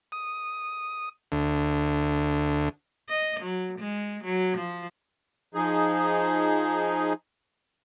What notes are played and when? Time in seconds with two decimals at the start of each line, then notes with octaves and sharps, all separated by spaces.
0.12 D#6
1.32 D2
3.09 D#5
3.41 F#3
3.79 G#3
4.24 F#3
4.58 F3
5.54 F3 D#4 G#4